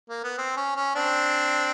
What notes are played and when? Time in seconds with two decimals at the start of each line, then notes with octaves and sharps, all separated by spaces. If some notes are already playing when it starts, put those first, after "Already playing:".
0.09 A#3
0.24 B3
0.38 C4
0.57 C#4
0.76 C#4
0.95 C4 D4